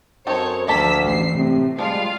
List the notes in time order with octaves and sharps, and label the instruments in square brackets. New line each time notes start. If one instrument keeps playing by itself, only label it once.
[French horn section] F#2 C5 [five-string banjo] C4 D#4 A4 [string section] C#5
[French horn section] D2 [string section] F3 E6 B6 [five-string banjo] A#3 A4 A5
[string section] A1 C7
[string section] A2 [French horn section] C3
[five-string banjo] F3 D4 [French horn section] G3 G#3 D5 [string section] F4 F5